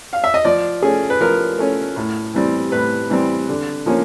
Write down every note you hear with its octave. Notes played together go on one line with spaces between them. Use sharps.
F5
E5
D#5
F3 D5
A3 C#4 G#4
B4
F3 A#4
A3 C#4
A2
E3 G3 C4
A2 B4
E3 G3 C4
D3
F3 A#3 C#4